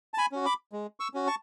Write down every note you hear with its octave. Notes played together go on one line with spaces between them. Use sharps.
A5
G#5 B5
C#4 F#4
B5 D6
G#3
C#6 E6
C#4 F#4
A5 C#6